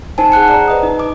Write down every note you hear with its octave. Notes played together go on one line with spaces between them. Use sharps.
D#4 C5 G#5 A5
G#4 F#5 F#6 C#7
D5 A#5
B4 D#5 D#6
D#4
D6